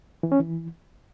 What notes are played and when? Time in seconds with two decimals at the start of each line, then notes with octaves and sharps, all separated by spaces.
0.23 E3
0.32 C#4
0.40 E3